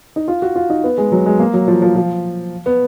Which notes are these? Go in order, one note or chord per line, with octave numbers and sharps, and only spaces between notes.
D#4
F4
F#4
F4
D#4
B3
G#3
F#3
G#3
A#3
F#3
F3
F3
F3
B3